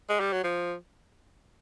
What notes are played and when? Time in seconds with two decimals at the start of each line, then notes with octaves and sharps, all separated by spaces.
0.09 G#3
0.20 G3
0.33 F#3
0.44 F3